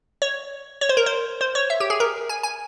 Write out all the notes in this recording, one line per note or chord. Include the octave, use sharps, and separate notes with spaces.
C#5
C#5
C5
A#4
C5
C5
C#5
E5
G4
G#4
A#4
G#5
G#5